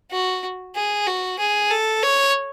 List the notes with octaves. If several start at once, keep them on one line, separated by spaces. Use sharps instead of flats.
F#4
G#4
F#4
G#4
A4
C#5